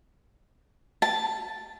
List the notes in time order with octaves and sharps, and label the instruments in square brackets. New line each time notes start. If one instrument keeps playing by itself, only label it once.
[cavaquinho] A5